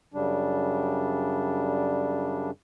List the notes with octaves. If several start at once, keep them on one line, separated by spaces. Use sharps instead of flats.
F#2 C#3 G3 D4